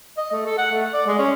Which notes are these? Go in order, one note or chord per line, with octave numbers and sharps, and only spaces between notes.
D#5
A3
A4
F#5
A3
D5
G#3
C#4